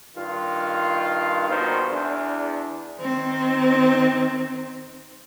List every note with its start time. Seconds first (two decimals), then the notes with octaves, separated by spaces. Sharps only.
0.16 G2 D#3 F4
1.49 A#1 G2 B2 D#3 A#3 C5
1.90 E2 D4
2.99 D#3 C4